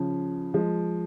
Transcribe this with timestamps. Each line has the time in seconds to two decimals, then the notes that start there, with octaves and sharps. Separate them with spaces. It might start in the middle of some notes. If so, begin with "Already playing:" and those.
Already playing: C#3 F3
0.54 F3 G#3